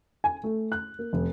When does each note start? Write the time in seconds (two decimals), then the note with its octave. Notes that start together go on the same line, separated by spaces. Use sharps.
0.24 G#5
0.44 A3
0.72 F#6
0.99 A#3
1.13 F1